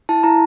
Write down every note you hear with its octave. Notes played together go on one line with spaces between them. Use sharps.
E4 A5
E4 A#5